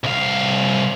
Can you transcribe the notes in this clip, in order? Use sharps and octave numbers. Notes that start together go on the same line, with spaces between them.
C2 F5